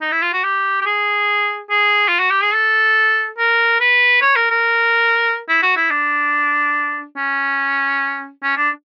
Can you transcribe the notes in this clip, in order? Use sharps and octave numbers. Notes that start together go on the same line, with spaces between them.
D#4
E4
F4
F#4
G4
G4
G#4
G#4
F4
F#4
G4
G#4
A4
A#4
B4
C#5
A#4
A#4
E4
F#4
E4
D4
C#4
C#4
D4